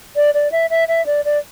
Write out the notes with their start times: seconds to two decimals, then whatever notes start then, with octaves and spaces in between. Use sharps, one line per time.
0.16 D5
0.34 D5
0.52 E5
0.70 E5
0.88 E5
1.06 D5
1.25 D5